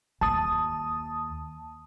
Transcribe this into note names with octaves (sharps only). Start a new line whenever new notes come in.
D#2 A5 D#6